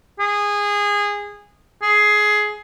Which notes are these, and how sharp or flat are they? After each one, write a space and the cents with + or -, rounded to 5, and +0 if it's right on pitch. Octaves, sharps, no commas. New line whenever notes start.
G#4 -20
G#4 +15